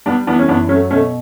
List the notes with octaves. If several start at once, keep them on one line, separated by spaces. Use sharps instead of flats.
G3 B3 D4
E3 B3 D4
C#4
F#2 B3 D4
F#3 A3 C#4
B2 A3 C#4